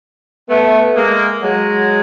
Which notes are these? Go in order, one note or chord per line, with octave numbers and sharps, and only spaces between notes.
A3 B3
G#3 A#3
F#3 G#3